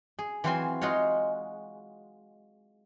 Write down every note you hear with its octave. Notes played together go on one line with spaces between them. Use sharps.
G#4
E3 F#3 C4 F4 C5 G#5
G#3 D#4 F4 F#4 C#5